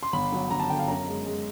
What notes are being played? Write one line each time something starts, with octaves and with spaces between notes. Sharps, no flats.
C6
G1 B5
F#3
G1 A#5
A5
D3 G5
F5
F#2 A#5
G#3
G#3